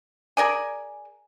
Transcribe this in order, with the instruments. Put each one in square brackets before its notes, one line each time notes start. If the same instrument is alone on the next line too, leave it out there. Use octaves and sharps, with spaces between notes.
[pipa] G#4 A#4 D5 G#5